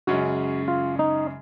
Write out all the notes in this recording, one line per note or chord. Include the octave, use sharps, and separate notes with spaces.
F#2 C#3 G#3 C#4 F#4
F4
D#4